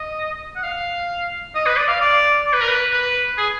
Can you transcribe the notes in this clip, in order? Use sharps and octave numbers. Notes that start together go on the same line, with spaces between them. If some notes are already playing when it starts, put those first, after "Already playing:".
Already playing: D#5
F#5
F5
D#5
B4
D5
F5
D5
D5
B4
A#4
B4
B4
G#4